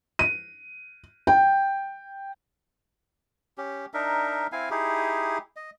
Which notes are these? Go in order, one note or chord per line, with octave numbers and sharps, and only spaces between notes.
D#7
G5
C#4 G4
D4 D#4 A#4 E5
C4 E4 F5 G#5
D#4 E4 G4 G#4
D#5